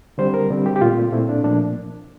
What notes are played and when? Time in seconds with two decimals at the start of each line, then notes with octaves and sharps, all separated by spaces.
0.18 D3 G3 C4 C5
0.34 A#4
0.50 D3 G3 C4
0.66 G4
0.76 G4
0.81 A#2 A3 C4 F4
1.12 A#2 A3 C4 E4
1.29 D4
1.43 A#2 F3 A#3 D4